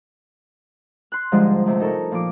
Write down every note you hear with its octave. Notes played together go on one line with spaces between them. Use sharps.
C6 F#6
G#2 D3 F3 G3 G#3
G#2 C3 A3
D#4 A4 A#4 C#5
A#2 F3 D6